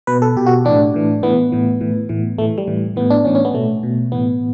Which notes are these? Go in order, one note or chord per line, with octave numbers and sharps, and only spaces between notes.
B2 B4
A4
B2 G4
F#4
A2 E3 D4
A2 E3
A2 E3 B3
A2 E3
A2 E3
A2 E3
A2 E3 A3
G3
A2 E3
A2 E3 B3
D4
A2 E3 C#4
C#4
B3
B2 A3
B2
A2 E3 B3